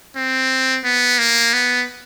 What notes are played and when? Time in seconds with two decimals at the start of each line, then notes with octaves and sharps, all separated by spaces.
0.17 C4
0.85 B3
1.19 A#3
1.53 B3